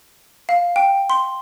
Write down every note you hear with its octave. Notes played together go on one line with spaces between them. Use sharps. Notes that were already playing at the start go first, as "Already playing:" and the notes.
F5
G5
C6